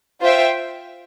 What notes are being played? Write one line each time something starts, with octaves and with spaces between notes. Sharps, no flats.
F4 C5 E5 G5